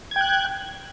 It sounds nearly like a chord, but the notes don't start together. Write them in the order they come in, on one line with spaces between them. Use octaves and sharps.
G#6 G5 F#6